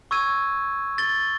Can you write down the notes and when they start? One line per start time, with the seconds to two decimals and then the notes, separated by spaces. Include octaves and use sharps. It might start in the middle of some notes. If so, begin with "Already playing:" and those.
0.11 C#6 E6 G#6 D#7
0.98 A6 G7